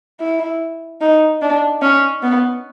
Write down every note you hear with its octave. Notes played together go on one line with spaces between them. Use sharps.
E4
D#4
D4
C#4
B3